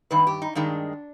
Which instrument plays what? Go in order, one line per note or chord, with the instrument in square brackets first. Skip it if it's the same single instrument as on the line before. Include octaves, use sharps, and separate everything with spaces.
[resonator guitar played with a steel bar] G2 D#3 B4
G4
D#4
G2 D#3 G#3 D4